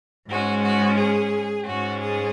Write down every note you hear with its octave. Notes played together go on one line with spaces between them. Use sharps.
G#2 G#3 C#4 F#4
F#4
G#4
G#2 G#3 C#4 F#4
G#4